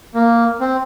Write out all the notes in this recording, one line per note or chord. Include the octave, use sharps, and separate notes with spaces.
A#3
C4